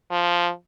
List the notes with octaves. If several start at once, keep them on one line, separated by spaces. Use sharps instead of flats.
F3